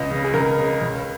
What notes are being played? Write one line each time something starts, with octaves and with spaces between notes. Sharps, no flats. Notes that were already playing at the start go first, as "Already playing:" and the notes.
Already playing: C#2 D#5
C#3
G#4
C#2 A#4
C#3
C#2